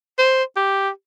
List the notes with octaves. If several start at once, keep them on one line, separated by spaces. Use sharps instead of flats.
C5
G4